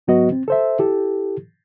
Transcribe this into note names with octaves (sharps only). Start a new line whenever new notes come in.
G#2 F#3 B3 F#4 B4 D#5
C4
A4 C5 E5
E4 G4 A4